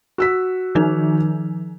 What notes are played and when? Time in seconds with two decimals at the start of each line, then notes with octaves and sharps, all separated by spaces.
0.18 F#4 E6 B6
0.75 D#3 F3 D#4